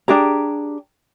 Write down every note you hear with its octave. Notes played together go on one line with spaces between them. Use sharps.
D4 G4 G#4 A#5